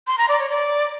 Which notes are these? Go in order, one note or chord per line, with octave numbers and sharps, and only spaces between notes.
C6
A#5
D5
C#5
D5